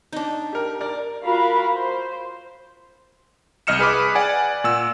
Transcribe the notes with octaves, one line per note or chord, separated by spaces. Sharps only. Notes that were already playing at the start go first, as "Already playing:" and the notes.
D4 D#4
G4 A#4
A#4 D5
F4 F#4 A#4 F5 B5
C5
C2 D#5 F6 C#7 E7
G#4 B4 B5 D6
D5 F#5 G#5
A#2 E6